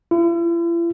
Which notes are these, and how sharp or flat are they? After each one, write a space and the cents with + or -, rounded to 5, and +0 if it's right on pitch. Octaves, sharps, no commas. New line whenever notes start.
E4 +45